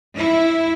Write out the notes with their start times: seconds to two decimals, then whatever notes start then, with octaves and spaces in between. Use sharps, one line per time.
0.18 E4